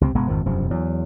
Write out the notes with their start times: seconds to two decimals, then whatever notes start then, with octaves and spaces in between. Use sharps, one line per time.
0.01 C#2 C3 C4
0.15 F#1 B2 G#3 B3
0.27 G#1 F2 D#3 F3
0.46 E1 F#2 C3 F3
0.71 E2 F#3